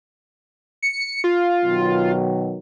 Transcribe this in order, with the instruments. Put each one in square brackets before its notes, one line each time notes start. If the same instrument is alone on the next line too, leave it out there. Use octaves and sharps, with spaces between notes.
[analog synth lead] C#7
F4
[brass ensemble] B2 D#3 F#3